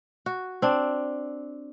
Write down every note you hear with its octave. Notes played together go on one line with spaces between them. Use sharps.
F#4
C4 D4